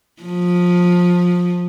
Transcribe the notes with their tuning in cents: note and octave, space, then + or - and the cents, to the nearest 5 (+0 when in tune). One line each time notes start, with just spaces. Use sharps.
F3 +20